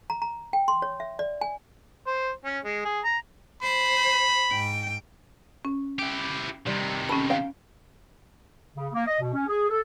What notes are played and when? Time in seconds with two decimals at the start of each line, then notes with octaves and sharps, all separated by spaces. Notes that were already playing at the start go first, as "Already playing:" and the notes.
0.10 A#5
0.22 A#5
0.53 G5
0.68 C6
0.82 C#5
1.00 E5
1.19 D5
1.41 G#5
2.07 C5
2.45 C#4
2.65 G#3
2.85 G#4
3.05 A#5
3.63 C5 B5
4.51 G#2 G5
5.65 C#4
5.99 E4 G4
6.67 C3 D#3 G3
7.09 C#4 A4 B5
7.30 F5 G5
8.77 C#3
8.93 A#3
9.07 D#5
9.20 B2
9.34 C#4
9.47 G#4
9.69 A4